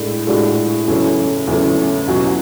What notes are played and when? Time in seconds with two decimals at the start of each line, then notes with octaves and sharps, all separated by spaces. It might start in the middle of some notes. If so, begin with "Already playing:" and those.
Already playing: A2 G#3 D4
0.27 A2 G#3 D4 F#4
0.87 E2 C#3 F#3 A3 C#4
1.48 E2 C#3 F#3 A3 C#4
2.08 E2 B2 F#3 C#4 F#4